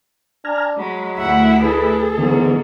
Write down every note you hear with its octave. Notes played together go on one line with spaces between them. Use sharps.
D4 G#5 A#5 F6
F#3 G#3 B5
D2 E4 E5 F#5
G#4 A4 B4
G#2 D3 E3 F#3 A#3 B3